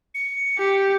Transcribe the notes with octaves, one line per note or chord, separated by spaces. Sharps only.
C#7
G4